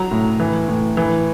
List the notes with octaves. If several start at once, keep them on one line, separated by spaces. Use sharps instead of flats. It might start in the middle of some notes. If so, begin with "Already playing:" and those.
Already playing: F#3 A#5
A2
E3
A2
E3